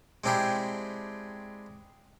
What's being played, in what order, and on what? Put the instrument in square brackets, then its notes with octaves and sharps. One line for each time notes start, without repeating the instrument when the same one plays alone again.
[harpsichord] G#3 C4 D4 E4 G4 G#4